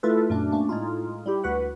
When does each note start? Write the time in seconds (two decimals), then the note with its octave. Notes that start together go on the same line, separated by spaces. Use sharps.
0.03 A3 E4 F4 A4 B4
0.30 F#2 A#2 A3 D4
0.52 A3 A#3 C#4 D4
0.69 A2 G#3 D#4 F4
1.26 G3 E4 G4
1.44 D2 F#4 B4 F#5